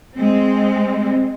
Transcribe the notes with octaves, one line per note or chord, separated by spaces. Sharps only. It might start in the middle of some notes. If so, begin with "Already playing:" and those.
G#3 C4